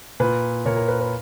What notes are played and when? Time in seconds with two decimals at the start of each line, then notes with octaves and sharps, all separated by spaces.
0.20 A#2 B4
0.65 A#2 A#4 C#5
0.77 A#4
0.88 B4
1.00 B4